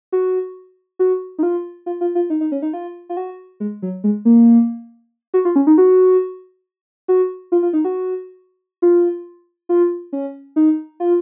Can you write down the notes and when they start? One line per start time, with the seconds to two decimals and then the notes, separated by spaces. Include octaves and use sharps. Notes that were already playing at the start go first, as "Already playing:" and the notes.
0.12 F#4
0.99 F#4
1.39 D#4
1.43 F4
1.86 F4
2.01 F4
2.15 F4
2.30 D#4
2.41 D#4
2.52 C#4
2.62 D#4
2.73 F4
3.09 F4
3.17 F#4
3.60 G#3
3.82 F#3
4.04 G#3
4.25 A#3
5.34 F#4
5.45 F4
5.56 C#4
5.67 D#4
5.78 F#4
7.08 F#4
7.52 F4
7.63 F4
7.73 D#4
7.85 F#4
8.82 F4
9.69 F4
10.13 C#4
10.56 D#4
11.00 F4